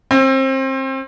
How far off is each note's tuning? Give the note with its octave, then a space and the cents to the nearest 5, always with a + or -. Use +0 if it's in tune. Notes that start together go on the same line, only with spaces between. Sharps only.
C4 +30